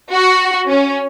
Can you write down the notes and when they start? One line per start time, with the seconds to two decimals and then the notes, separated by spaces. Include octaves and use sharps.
0.13 F#4
0.69 C#4